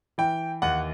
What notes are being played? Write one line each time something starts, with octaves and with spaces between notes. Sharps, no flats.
E3 G5
D#2 F#5